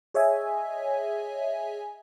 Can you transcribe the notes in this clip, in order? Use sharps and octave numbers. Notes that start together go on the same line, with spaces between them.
G#4 C#5 D#5 E5 G#5